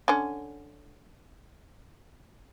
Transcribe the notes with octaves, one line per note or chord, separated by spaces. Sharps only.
D3 C#4